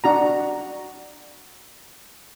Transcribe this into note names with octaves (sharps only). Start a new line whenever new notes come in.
D4 F#4 A#5